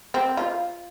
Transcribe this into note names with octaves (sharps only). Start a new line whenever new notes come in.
C4
F4